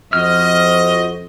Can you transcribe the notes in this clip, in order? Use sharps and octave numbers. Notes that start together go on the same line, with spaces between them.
F2 F#4 C5 D#5 F6